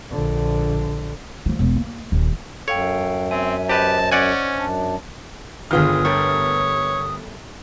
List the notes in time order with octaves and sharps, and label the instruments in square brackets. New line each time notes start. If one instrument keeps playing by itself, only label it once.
[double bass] A#1 D3
[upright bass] E3 F3
E1
A#3
D#1 D#3
[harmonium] F#2 [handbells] A4 F5 G5 [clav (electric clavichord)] C#5
[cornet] C4 [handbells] E5 G#5
[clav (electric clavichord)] G4 B4 [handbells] C5 D#5 [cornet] A5
[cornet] C#4 [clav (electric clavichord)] D5 F#5 G#5
[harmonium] F#2 D4
[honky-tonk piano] G1 B3 F6 [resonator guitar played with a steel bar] D#3 F4 G#4 [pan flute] D#6
[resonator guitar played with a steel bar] G3 A3 A#4 [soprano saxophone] C#5